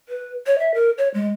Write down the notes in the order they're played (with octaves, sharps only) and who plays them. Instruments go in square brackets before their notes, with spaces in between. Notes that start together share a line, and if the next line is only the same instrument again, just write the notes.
[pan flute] B4
C#5
E5
A#4
C#5
G#3